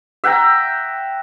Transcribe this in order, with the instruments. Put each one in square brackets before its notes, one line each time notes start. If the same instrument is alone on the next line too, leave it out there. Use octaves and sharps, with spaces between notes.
[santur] E5 F#5 G5 A#5